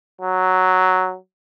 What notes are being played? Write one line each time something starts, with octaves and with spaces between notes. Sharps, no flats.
F#3